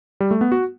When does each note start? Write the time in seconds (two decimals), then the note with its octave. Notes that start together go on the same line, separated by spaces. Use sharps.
0.20 G3
0.31 A3
0.41 B3
0.52 F#4